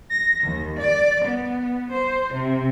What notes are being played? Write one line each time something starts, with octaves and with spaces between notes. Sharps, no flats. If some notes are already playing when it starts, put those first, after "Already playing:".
A#6
D#2
D5
B3
C5
C3